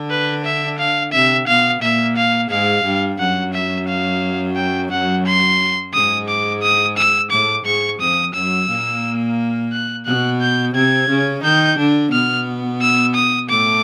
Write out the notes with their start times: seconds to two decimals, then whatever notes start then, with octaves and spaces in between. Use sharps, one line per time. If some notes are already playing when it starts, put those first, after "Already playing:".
Already playing: D3 D4
0.10 B4
0.45 E5
0.79 F5
1.12 C3 C4 E5
1.47 B2 B3 F5
1.81 A#2 A#3 E5
2.17 F5
2.50 G#2 G#3 F5
2.85 G2 G3
3.19 F#2 F#3 F#5
3.54 E5
3.88 F5
4.56 G5
4.91 F#5
5.26 C6
5.94 G#2 G#3 D#6
6.28 D6
6.62 D#6
6.97 E6
7.31 A2 A3 D6
7.65 G#2 G#3 C#6
8.00 F2 F3 D#6
8.34 F#2 F#3 E6
8.69 A#2 A#3
9.72 F#6
10.06 B2 B3 F#6
10.41 G6
10.74 C3 C4 G#6
11.09 C#3 C#4
11.43 D#3 D#4 G6
11.78 D3 D4
12.12 B2 B3 F6
12.82 E6
13.15 D#6
13.49 A2 A3 D6